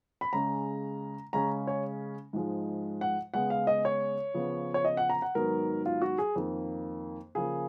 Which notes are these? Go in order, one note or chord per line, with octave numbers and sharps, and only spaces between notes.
B5
C#3 G#3 C#4 A#5
C#3 G#3 C#4 A#5
C#5
G#2 F3 G#3
F#5
C#3 G#3 B3 F#5
F5
D#5
C#5
C#3 F3 B3
C#5
D#5
F#5
A#5
F#5
G#2 D#3 F#3 B3 A#4
F4
F#4
G#4
F2 D#3 A#3
C#3 F3 A#3 G#4